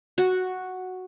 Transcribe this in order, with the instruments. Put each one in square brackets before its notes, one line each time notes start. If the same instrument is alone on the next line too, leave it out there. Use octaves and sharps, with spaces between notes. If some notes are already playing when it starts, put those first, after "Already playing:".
[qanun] F#4